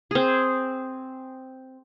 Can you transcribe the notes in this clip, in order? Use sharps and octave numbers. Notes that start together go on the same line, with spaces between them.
C4 G#4